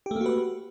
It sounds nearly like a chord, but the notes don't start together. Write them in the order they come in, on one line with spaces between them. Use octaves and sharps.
G4 A3 A#3 F#4 B4